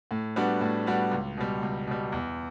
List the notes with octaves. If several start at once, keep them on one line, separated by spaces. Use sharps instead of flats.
A2
G3 B3 D4 F#4
A2
G3 B3 D4 F#4
C#2
B2 G3
C#2
B2 G3
E2